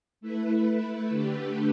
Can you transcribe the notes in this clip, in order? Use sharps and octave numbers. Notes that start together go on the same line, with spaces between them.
A3 E4 B4
D3 A3 D4 G4 B4